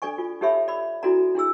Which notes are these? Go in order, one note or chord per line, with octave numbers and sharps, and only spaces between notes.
D4 A4 D5 G#5 C#6
F4
D#4 G4 A4 C#5 E5 B5
D5 B5
D4 E4 F#4 A4 D5 A#5
D4 E4 G#4 E6